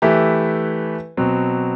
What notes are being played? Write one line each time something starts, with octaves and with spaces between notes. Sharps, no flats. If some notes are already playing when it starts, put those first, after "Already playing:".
E3 A3 E4 G4 B4
B2 F#3 C4